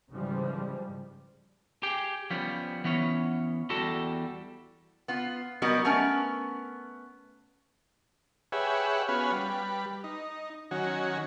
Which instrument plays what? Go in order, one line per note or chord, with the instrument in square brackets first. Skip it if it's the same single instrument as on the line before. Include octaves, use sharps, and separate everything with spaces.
[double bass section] G#2 C#3 E3 F3 G3
[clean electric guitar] G4 G#4 G5
F3 G3 B3 C#4
E3 B3 C#4 C#5
E2 G3 F#4 A4 A5
[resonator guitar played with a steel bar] B3 F4
F#3 G3 B3 D#4 F#4 A#4
A3 B3 C#4 A#4
[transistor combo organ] G4 G#4 B4 C#5 E5 F#5
B3 C#4 F#4 B4 F5 G#5
G3 B4
D#4
D#3 F#3 C#4 F#4 G#5